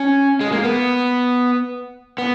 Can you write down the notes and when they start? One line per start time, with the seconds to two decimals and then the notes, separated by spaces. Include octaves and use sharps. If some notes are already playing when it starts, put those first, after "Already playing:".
Already playing: C#4
0.41 G#3
0.52 A#3
0.64 B3
2.18 B3